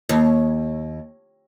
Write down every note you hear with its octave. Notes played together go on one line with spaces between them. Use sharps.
D#2